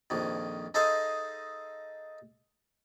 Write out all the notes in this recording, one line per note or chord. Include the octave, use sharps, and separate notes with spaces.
A#1 F2 D#3
D#4 G#4 A4 C5 D#5 F5